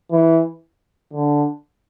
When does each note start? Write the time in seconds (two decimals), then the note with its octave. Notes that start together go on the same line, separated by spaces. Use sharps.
0.11 E3
1.13 D3